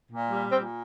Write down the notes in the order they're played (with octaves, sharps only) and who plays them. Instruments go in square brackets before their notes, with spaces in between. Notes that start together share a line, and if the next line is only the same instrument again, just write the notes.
[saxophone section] A#2
G3
A#2 C4